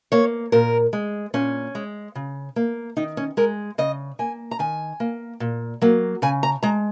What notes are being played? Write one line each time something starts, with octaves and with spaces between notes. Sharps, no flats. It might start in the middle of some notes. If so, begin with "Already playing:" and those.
A#3 C#5
A#2 A#4
G#3
A#2 C#4
G#3
C#3
A#3
D#3 D#4
C#4
G#3 A#4
C#3 D#5
A#3 G#5
A#5
D#3 G#5
A#3
A#2
F#3 A#3
C#3 G#5
A#5
G#3 A#5